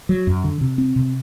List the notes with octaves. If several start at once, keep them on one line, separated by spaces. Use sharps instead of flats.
F#3
F#2
D3
C3
C4
C3